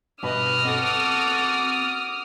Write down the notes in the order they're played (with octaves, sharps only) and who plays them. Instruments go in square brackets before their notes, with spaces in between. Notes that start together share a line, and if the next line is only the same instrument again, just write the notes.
[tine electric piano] G2 B2 B5 [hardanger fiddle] B4 D#5 [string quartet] D6 D#6 F6
[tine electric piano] C4 [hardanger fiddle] F#4 A4